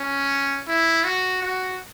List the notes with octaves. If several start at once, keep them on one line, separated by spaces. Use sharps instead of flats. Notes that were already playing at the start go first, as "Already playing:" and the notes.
Already playing: C#4
E4
F#4
F#4